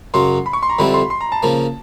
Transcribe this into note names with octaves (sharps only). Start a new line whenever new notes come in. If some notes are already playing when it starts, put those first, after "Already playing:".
F#2 C#3 F#3 C6
B5
C#6
C6
A#5
F2 D3 G3 C4 E4 B5
C6
C6
A#5
A5
C#3 F3 A#3